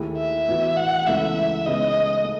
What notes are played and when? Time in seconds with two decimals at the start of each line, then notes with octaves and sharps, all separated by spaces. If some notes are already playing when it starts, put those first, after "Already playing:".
Already playing: D#2 D#3 A3 E4 G#4
0.18 E5
0.48 A2 E3 B3 F#4
0.77 F#5
1.07 C#2 C#3 E3 A3 E4 E5
1.65 C#3 G#3 B3 D#4 D#5
2.24 A3